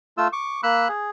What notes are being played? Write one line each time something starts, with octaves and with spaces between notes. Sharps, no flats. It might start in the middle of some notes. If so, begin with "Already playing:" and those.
A3 F4 E6
C#6 D6
A#3 B5 E6 F#6
G#4